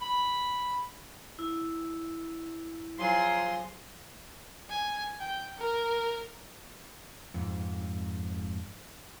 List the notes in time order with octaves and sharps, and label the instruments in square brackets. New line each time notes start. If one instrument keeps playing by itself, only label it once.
[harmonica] B5
[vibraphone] E4
[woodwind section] F3 F#3 [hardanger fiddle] G#4 C6
[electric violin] G#5
G5
A#4
[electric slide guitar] F2 G#2